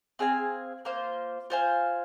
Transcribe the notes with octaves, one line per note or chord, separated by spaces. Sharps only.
C4 G#4 F5 G#5
A#3 F4 C5
F4 C5 F5 G#5